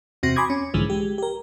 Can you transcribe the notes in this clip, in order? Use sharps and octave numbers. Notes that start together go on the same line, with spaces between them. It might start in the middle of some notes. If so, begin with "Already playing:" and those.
E2 C3 C4 F#4 A#6
G#5 B5 C6 D6 D#6 G#6
C#4
B1 G#2 D3 E3 F3 G#3
G#3 G4
G4 A#4